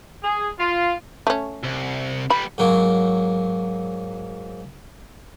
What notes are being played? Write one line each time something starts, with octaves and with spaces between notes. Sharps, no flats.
G#4
F4
A3 C#4
C2
G3 B3 B5
G#2 F#3 A#3